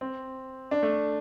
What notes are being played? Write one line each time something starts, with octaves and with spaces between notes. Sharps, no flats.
C4
D4
A3